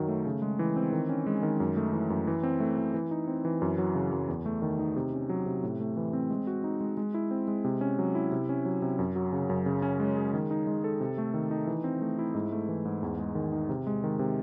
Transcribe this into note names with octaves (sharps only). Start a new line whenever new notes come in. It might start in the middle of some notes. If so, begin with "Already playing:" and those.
Already playing: F#2 D#3 F#3
A3
C#3
G#3
E3
C4
D#3
C#4
G#3
D#3
F#2
A3
E3
F#2
E3
C4
A3
E3
E3
D#4
C4
E3
F#2
F#3
C#3
F#2
E2
A3
D#3
D#4
C3
C#4
F#3
C3
A2
A3
E3
C4
G#3
F#4
D#4
G#3
G#3
E4
C4
G#3
C3
C#4
F#3
E4
C3
C#4
F#3
C3
F#2
F#3
C#3
F#2
C#3
C#4
G#3
G#4
D#3
D#4
G#3
A4
C3
A3
D#3
D#4
E3
C4
A3
E4
G#2
A3
E3
G#2
E2
G#3
D#3
D#4
C3
G#3
D#3
C3